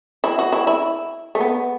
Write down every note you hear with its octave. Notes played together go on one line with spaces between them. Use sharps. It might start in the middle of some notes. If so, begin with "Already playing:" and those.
E4
F#4
E4
E4
A3
B3